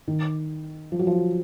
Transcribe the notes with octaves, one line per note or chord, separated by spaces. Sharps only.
D#3
F3
F#3
F3